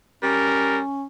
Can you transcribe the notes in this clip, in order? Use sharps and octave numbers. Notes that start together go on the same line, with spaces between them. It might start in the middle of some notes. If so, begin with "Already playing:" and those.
G3 C#4 A#4